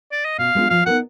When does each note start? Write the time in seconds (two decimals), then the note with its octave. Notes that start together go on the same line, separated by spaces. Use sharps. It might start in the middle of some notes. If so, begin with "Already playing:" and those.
0.12 D5
0.25 D#5
0.38 B2 F5
0.55 G#3 B3 D4 F4
0.70 F3 F5
0.86 B3 D#4 A#4 F#5